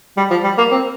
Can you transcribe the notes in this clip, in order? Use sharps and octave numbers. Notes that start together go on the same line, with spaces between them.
G3
F3
G3
A#3
C4